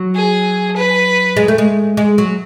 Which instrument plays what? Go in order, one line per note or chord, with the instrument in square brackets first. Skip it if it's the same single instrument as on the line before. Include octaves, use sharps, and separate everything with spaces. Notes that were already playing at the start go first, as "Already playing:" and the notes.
Already playing: [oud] F#3
[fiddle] G#4
B4
[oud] G#3
A3
G#3
G#3
F#3